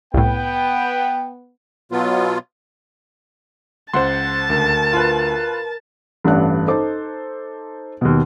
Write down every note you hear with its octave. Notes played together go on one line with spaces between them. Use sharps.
C2 A2 B3 G5
B2 F#3 B3 F4
C#2 C5 F#5 A5 C6
D2 A#4
F4 B4
A1 G2 A3 D4 F#6
D#4 A4 C5 D6
D#2 B2